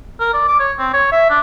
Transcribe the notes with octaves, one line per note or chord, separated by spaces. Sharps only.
A#4
D5
D6
C#5
C4
C#5
E5
D4